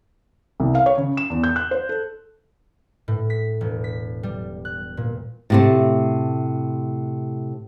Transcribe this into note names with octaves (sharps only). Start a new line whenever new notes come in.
C2
F5
C#5
C#3
E7
E2
G6
F#6
C5
A4
A2
B6
E1
B6
G3
F#6
A#2
A2 C3 A3